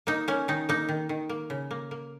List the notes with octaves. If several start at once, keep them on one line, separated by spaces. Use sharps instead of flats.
A#3 D#4
A#3 C#4
D#3 D#4
A#3 D#4
D#3
D#3
A#3
C#3
A#3
A#3